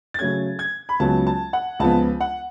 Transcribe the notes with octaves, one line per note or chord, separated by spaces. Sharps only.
A6
C#3 F#3 A3 C#4 G#6
G#6
B5
C#2 C#3 F#3 B3 A5
A5
F#5
C#2 C#3 F3 B3 A5
F#5